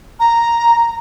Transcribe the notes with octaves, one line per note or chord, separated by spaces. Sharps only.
A#5